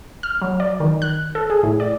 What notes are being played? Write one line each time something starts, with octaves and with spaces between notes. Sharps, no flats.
F6
F#3
D5
D#3
F#6
A4
G#4
A2
D5